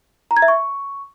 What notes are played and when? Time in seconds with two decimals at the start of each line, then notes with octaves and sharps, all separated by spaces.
0.31 A#5
0.37 G#6
0.42 E5
0.48 C#6